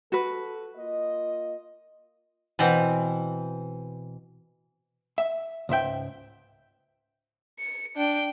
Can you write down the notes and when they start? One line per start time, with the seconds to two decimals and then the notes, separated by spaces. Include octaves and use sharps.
0.12 F#4 A4 B4
0.76 A#3 F4 D#5
2.59 B2 E3 C4
5.18 E5
5.69 C#2 G#2 E5 G5
7.59 C#7
7.96 D4 G5